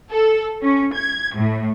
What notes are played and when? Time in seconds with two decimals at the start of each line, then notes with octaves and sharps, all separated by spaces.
0.10 A4
0.62 C#4
0.94 G#6
1.36 A2